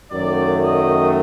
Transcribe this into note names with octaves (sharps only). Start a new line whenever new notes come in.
F#2 D#3 F#3 A3 D5
D#5